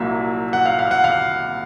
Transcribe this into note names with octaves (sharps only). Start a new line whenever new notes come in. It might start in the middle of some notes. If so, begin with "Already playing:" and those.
Already playing: C2 A#2 F#3 A#3 E5
F#5
F5
F5
F#5
F5